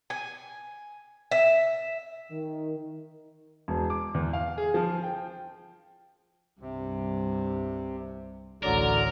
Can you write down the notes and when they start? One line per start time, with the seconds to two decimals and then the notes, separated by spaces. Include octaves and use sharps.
0.10 G#5
1.31 E5
2.32 D#3
3.68 E1
3.90 D6
4.14 E2
4.33 F5
4.58 G#4
4.74 F3
5.03 G5
6.61 C2 G2 C3
8.63 A1 D2 D3 F#3 A#4 D5